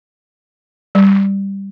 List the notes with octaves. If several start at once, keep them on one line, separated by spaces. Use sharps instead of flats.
G3